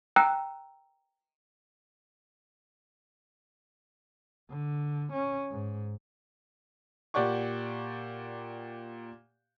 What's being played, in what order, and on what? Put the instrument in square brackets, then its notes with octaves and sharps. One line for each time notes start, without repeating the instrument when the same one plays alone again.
[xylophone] G5 A#5 E6 F#6
[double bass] D3
C#4
G#2
[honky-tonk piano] A#2 G4 D5 F#5 C#6